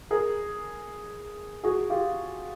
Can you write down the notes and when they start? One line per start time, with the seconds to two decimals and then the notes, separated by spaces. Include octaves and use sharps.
0.11 G#4 A#4
1.63 F#4 G#4
1.90 F4 G4